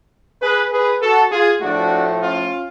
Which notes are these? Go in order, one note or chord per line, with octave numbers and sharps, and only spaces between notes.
G#4 B4
G#4 B4
F#4 A4
F4 G#4
A2 F3 A3 D4 F#4
C#4 F4